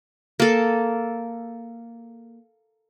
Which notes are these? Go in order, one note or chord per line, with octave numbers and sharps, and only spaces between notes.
A#3 A4